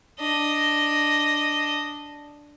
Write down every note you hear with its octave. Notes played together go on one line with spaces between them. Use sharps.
D4 D#5